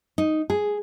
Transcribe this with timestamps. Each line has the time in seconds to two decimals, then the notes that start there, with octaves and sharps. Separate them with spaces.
0.18 D#4
0.50 G#4